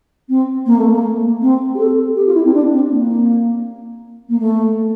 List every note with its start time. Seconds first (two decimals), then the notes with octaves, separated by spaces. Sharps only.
0.29 C4
0.66 A#3
0.77 A3
0.89 A#3
1.41 C4
1.74 G4
1.78 A4
2.15 G4
2.25 F4
2.34 E4
2.44 C4
2.53 D4
2.72 C4
2.90 A#3
4.28 A#3
4.39 A3